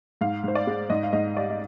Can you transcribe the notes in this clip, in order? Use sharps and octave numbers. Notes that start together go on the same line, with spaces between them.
G#2 F5
G#2 C5
D5
G#3
G#2 D#5
F5
G#2 D#5
G3 D5
D#5